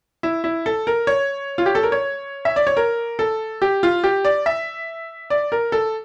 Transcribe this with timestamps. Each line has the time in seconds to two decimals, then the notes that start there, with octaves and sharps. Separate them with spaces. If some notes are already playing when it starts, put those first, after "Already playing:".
0.23 E4
0.44 E4
0.66 A4
0.87 A#4
1.07 C#5
1.58 F4
1.66 G4
1.75 A4
1.83 A#4
1.92 C#5
2.45 E5
2.56 D5
2.67 C#5
2.77 A#4
3.19 A4
3.62 G4
3.83 F4
4.04 G4
4.25 D5
4.46 E5
5.30 D5
5.52 A#4
5.72 A4